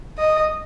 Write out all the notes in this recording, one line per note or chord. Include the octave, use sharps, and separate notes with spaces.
D#5